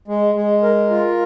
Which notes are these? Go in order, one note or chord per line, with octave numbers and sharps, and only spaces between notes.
G#3
G#3
A#4
F4